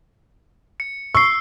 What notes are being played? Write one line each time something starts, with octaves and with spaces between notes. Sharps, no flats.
C#7
C#6 E6 C7